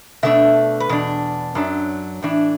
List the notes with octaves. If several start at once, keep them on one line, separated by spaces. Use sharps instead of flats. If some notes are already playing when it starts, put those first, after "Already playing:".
B2 A3 D4 E5
B4
E2 B2 D4
F#2 F#3 D4
A2 E3 D4